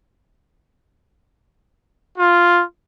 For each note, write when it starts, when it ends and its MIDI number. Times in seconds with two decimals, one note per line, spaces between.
2.17 2.62 65